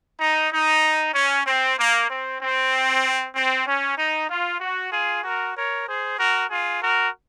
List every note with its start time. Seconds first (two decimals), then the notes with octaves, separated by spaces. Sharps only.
0.20 D#4
0.52 D#4
1.14 C#4
1.45 C4
1.78 A#3
2.09 C4
2.40 C4
3.34 C4
3.66 C#4
3.97 D#4
4.29 F4
4.60 F#4
4.92 F4 G#4
5.23 F#4 A#4
5.55 A#4 C#5
5.86 G#4 C5
6.17 F#4 A#4
6.49 F4 G#4
6.80 F#4 A#4